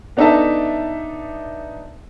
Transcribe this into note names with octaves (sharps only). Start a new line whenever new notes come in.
B3 D4 D#4 A4 E5 A5